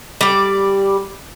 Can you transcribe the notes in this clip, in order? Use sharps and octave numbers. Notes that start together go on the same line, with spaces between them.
G3 D5